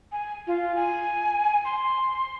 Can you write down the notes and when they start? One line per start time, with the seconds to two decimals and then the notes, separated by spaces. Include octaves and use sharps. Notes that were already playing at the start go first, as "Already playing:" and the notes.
0.12 G#5
0.47 F4
0.76 G#5
1.65 C6